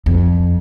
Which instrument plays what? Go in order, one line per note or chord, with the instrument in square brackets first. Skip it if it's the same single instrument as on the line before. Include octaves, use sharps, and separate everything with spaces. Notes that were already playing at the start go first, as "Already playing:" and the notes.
[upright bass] F2